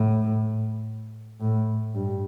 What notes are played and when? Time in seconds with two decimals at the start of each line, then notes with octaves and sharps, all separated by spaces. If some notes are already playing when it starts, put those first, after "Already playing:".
Already playing: A2
1.40 A2
1.94 G2